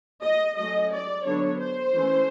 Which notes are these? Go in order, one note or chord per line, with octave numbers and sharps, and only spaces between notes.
D#5
F#3 A3 C#4 D#5
D5
D3 F#3 B3 D4 C#5
C5
E3 A3 C#4